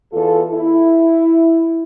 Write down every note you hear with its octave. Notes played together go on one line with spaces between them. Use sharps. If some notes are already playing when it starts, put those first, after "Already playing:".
E2 F4 A4
E4